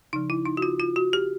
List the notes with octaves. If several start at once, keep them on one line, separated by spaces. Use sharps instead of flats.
C#3 F3 D#4
E4
D#4
F#4
F4
F4
F#4
G4